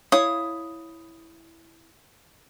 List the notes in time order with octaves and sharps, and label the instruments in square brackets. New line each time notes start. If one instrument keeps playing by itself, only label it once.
[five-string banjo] E4 C#5 F5 [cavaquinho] D#6